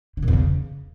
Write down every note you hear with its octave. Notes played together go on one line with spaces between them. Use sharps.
D3
A#2
E2
C#3